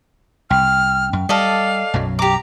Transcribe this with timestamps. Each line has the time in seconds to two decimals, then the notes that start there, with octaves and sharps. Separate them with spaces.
0.50 C2 G5 F6
1.13 F#2
1.29 G3 A4 D5 D#5 F5
1.94 B1 F#2 F#3
2.19 G4 A#5 D6